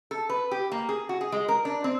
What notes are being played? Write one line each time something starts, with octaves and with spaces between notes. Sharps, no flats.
A4
B4
G4
A#3
G#4
F#4
G#4
G#3
A#4
D4
C4